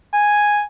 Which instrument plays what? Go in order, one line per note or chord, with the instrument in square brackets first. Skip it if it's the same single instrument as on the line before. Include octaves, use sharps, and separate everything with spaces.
[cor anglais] G#5